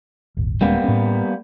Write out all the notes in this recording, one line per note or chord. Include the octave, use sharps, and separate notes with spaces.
D#1 G#1
D#1 G3 G#3 A#3 B3 C#4
A2 C#4